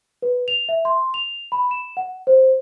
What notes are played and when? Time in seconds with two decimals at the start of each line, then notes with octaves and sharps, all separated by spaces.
0.22 B4
0.48 F7
0.69 E5
0.85 C6
1.14 F7
1.52 B5
1.71 E7
1.97 F#5
2.27 C5